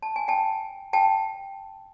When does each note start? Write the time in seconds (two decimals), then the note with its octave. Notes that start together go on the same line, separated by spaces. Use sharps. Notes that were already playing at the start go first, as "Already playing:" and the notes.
0.02 A5
0.16 G#5
0.28 G5 A5
0.93 G5 A5